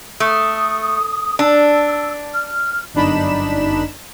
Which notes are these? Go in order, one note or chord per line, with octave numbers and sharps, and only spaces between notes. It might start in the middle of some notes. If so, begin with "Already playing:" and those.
A3 D#6
D4 E6
F6
G1 F#2 D4 D#4 B5 E7